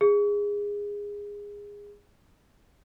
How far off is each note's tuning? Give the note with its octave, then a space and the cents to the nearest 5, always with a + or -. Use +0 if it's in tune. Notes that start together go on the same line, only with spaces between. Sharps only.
G#4 -20